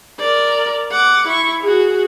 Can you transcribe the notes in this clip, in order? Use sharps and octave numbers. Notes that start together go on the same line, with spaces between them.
A#4 D5
F#5 D6
E4 C#6
F#4 G#4